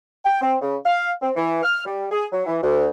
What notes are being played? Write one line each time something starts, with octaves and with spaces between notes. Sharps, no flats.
G5
C4
C#3
F5
C4
E3
F6
G3
G#4
F#3
E3
D2